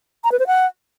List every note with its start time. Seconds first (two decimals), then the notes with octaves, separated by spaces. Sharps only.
0.24 A#5
0.32 B4
0.39 C5
0.47 F#5